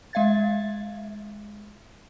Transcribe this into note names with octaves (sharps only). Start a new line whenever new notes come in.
G#3 E5 F5 G#6 A6